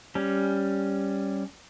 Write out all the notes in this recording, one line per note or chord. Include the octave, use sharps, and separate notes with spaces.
G3 C#4